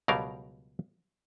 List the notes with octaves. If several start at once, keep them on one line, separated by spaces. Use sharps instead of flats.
C#2 B2 F#3 G3 A#4 F5